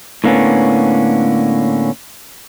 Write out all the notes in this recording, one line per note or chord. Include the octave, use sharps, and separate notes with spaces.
A2 D3 A#3 B3 C#4